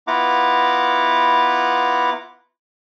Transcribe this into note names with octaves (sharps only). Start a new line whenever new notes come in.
B3 E4 F4 F#5 A#5 D6